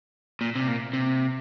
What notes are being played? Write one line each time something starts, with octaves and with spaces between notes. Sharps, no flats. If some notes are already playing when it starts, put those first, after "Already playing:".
A#2
C3
A#2
C3